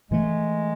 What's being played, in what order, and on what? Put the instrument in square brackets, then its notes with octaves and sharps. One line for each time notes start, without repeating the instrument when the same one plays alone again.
[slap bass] A2 E3 A3 [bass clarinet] G#3